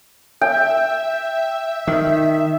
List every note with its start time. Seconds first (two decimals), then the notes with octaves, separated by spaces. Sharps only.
0.41 E5 G5
1.87 D#3